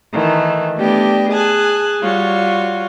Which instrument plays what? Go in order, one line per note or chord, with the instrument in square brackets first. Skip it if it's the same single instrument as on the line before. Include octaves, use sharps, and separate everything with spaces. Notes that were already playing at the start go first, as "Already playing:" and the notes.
[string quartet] D#3 E3 A3
A3 B3 D4 G4 D#5 G5
G#4 G#5 A5 F#6
G3 F4 F#4 C#5